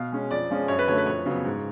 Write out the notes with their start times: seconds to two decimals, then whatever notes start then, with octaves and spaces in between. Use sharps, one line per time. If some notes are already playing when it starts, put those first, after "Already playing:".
Already playing: B2 F5
0.12 G#3 C#4
0.31 F2 D5
0.50 F3 G#3 C#4
0.68 F#2 C#5
0.79 B4
0.88 D3 F#3 A3 C#5
0.98 B4
1.06 F2 C#5
1.26 C#3 F#3 B3
1.45 G#2